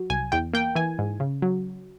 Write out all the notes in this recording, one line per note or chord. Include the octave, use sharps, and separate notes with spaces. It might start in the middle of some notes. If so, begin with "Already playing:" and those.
Already playing: F#3
C2 G#5
E2 G5
A#3 G5
E3 G#5
G#2
C#3
F#3